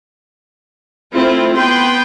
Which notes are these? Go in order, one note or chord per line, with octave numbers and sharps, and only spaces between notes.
A3 C4 E4 F4
B3 B4 G5 C6